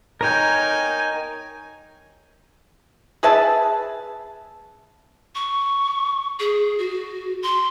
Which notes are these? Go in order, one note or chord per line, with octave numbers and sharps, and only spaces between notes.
D#4 A#4 C#5 G5 G#5
G#4 B4 E5 A5
C#6
G#4
F#4
C6